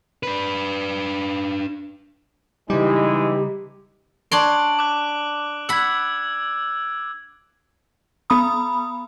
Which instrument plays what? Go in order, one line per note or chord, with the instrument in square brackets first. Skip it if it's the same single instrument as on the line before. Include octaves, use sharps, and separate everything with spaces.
[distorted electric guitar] D4 B4
[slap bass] C#3 G3 [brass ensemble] E3 G#3 [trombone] D#4 [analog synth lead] G4
[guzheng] D4 C#5 C6 [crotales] D7 F#7
[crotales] D6 F#6
[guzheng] F#5 B5 [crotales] E6 G#6
[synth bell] B3 B5 D#6